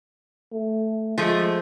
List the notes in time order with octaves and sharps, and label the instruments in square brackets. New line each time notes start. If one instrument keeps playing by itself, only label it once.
[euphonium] A3
[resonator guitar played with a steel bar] F3 A3 [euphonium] G#3